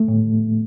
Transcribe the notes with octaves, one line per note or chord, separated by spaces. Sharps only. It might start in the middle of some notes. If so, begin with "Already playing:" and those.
Already playing: A3
A2